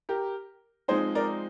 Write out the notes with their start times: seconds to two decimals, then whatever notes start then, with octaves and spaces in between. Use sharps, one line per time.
0.09 G4 A#4
0.88 F3 G#3 C4 D#4 G#4 C5
1.15 A#4 D5